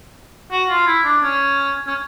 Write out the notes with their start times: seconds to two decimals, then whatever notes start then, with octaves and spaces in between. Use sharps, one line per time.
0.51 F#4
0.69 F4
0.87 E4
1.04 D4
1.23 C#4
1.87 C#4